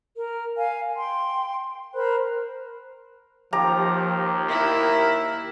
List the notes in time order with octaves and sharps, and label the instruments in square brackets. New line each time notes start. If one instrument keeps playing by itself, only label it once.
[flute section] A#4
F5 G#5
G5 C6
A#4 C5 B5 F#6
[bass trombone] D#2 [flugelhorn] F3 [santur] G4 A#5
[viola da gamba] E4 [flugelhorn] A#4